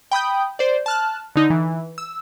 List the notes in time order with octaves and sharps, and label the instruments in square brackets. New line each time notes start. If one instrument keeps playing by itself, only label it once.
[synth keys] G5 B5 D#6 G6
C5 D5
A5 F6 F#6
D3 D#4
E3
E6